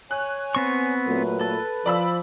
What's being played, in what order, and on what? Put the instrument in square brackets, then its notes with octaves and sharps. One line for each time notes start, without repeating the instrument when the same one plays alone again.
[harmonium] C#5 G#5 [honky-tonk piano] F#6
[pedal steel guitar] B3 C4 C#6
[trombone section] A#2 F#3 A3 [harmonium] B4
[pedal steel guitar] A4
[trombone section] F3 [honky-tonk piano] D5 B5 E6